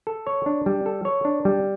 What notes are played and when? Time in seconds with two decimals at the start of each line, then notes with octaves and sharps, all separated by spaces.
0.07 A4
0.27 C#5
0.46 D4
0.66 G3
0.86 A4
1.05 C#5
1.25 D4
1.45 G3